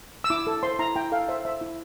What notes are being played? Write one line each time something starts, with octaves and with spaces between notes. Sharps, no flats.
E6
E4 D6
A4
C5 C6
E4 A#5
E4 G5
A4 F5
C5 E5
C5 E5
E4